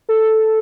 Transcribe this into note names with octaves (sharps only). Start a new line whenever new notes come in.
A4